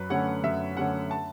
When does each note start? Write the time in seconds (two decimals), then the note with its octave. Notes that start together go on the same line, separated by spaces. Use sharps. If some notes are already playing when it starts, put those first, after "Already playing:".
Already playing: F#2 B4
0.10 D3 A3 C#4 F#5
0.44 F#2 E5
0.77 D3 A3 C#4 F#5
1.11 A5